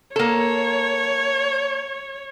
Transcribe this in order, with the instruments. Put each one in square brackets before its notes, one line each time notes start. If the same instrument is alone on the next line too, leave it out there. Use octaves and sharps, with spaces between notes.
[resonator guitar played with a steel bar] A#3 A4 [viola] C#5